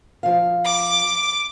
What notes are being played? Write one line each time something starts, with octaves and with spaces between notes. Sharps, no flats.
F3 F5
D6